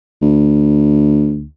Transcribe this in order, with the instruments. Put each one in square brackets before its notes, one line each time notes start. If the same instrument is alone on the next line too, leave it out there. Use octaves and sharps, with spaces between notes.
[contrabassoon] D2